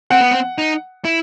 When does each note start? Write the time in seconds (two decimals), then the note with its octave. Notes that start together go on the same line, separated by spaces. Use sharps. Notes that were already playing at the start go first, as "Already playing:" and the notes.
0.10 C4 F#5
0.21 B3
0.31 C4
0.58 D#4
1.05 E4